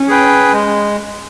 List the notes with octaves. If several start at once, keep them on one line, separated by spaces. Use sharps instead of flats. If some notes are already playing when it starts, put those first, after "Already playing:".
Already playing: C#4
G#4 B4 G5
G#3